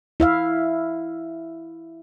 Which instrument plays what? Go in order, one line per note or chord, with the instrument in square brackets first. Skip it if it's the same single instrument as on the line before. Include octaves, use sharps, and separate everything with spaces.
[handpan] E4 E5 F5